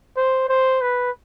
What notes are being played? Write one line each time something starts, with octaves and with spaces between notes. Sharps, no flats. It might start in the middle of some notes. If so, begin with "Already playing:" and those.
C5
C5
B4